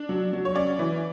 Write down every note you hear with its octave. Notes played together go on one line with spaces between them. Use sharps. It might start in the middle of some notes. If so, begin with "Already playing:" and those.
Already playing: D4
F#3
F#3
C#5
C#4 D5
E3